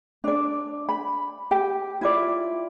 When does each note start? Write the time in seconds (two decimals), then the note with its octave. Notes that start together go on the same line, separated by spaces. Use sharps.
0.24 D4 D5
0.89 B5
1.51 G4 G5
2.01 E4 F4 D5